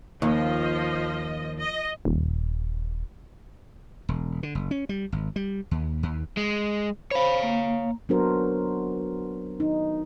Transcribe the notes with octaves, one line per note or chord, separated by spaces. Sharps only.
D#2 F3 D#5
D#5
D#1
E1
D3
F#1
C#4
G3
G#1
G3
D#2
D#2
G#3
C5 C#5 F5 B5
A#3
F#3 B3 D4 F#4 A#4 C5
D#4